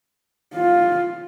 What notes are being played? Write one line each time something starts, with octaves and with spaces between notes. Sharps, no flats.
F4